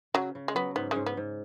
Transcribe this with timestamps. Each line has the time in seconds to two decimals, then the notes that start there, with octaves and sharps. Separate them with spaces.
0.14 C#3 F#3
0.35 C#3
0.48 G#3
0.55 F#3 B3
0.76 G#2 B3
0.91 G#2 G#3 C#4
1.06 B3
1.17 G#2